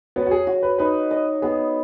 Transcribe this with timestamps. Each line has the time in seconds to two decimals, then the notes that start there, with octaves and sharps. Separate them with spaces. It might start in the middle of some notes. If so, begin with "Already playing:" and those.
0.16 F#3 B3
0.26 F#4
0.31 G#4
0.47 F#4
0.63 B4
0.78 D#4 B4
1.11 D#5
1.42 B3 G#4